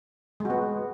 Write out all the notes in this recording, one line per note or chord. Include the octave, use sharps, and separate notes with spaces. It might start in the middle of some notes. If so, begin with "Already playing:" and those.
G#3 B3 F#4